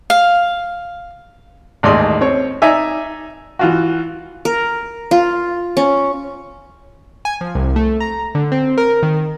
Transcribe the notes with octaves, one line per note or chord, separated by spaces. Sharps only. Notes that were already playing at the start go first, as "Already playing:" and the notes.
F5
A1 D#2 G#3 D5 C6 D#6
C4 C#5
D#4 D5 E5 G#5
E3 F4 F#4
A#4
F4
C#4
G#5
F3
C2
A3
A#5
D3
C4
A#4
D#3